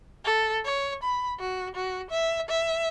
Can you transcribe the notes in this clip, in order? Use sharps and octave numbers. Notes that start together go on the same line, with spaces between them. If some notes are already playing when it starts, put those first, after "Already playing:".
A4
C#5
B5
F#4
F#4
E5
E5